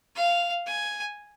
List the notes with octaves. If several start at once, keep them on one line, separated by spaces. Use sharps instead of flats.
F5
G#5